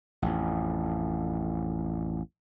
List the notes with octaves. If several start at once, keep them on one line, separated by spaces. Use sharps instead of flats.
A1 F2